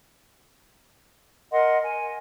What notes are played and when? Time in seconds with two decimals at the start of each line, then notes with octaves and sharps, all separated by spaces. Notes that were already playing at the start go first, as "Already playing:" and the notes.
1.52 A#4 D#5 F#5 C6
1.83 G#5